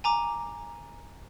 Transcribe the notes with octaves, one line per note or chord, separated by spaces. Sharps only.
G#5 A#5 D6